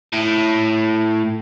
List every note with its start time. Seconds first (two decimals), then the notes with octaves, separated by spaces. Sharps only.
0.13 A2